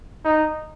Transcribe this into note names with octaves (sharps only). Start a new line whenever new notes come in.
D#4